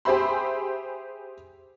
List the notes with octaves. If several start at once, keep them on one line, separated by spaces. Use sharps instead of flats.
G4 G#4 C5 E5 B5 C6